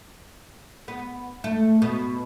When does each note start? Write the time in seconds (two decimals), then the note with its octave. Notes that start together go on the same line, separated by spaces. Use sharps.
0.88 B3
1.44 A3
1.82 B2